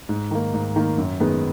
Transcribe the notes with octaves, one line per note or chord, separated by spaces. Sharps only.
G#2
D#3 A#3
G#2
D#3 A#3
F#2
D#3 G#3 B3